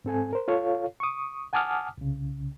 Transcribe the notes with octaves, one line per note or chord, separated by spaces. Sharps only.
G#2 C4 A4 G#5
A#4 C5
F4 A4 C#5 F5
C#6 D#6
F#5 G#5 A5 D6 D#6 F6
C2 C#3